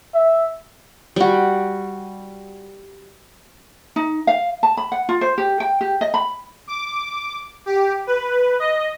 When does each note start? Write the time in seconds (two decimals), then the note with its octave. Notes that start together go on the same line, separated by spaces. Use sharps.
0.15 E5
1.16 G3 F#4
3.96 D#4
4.27 F5
4.63 A5
4.77 B5
4.92 F#5
5.09 F4
5.21 C5
5.38 G4
5.60 G5
5.81 G4
6.01 D#5
6.14 B5
6.67 D6
7.66 G4
8.07 B4
8.59 D#5